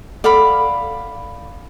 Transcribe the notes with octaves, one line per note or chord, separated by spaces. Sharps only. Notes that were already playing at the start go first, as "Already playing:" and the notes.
A4 D5 F5 F#5 B5